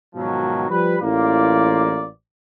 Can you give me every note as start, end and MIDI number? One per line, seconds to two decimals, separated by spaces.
0.15 0.65 44
0.15 0.65 47
0.15 0.65 51
0.15 0.65 53
0.15 0.65 54
0.70 0.95 53
0.70 0.95 55
0.70 0.95 71
1.01 2.05 33
1.01 2.05 52
1.01 2.05 58
1.01 2.05 65
1.01 2.05 74